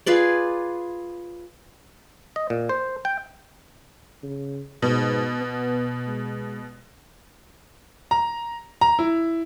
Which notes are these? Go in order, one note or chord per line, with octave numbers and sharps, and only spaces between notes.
F4 G#4 B4 D5
D#5
A#2
C5
G5
C#3
G#2 B2
B3
G#3
A#5
A#5
E4